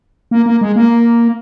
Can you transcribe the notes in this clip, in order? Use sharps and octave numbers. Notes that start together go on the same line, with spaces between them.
A#3
A#3
G#3
A#3